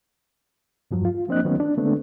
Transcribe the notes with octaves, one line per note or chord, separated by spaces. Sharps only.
E2 G2 F3 F#3
F4
F3 A#3 C4 D4 D#5 F#6
D#3 F#3 A3 B3 C#4 D#4
D4
D3 G#3 A3 B3 C4 D4